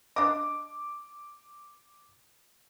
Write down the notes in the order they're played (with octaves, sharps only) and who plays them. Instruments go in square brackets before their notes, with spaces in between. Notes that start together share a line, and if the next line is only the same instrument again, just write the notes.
[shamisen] D4 D#5 [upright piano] D6